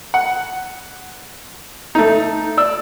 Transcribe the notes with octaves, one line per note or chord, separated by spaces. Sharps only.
F#5
A3 D#4
D5 E6